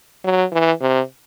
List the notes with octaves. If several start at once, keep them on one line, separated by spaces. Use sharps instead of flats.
F#3
E3
C3